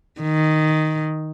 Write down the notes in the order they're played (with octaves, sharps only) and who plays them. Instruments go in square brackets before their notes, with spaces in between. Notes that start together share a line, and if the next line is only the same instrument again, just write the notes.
[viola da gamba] D#3